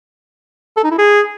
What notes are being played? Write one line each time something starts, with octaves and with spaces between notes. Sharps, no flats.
A4
D#4
E4
G#4